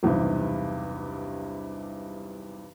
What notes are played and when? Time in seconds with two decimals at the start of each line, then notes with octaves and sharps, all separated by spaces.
0.03 B1 E2 G2 C3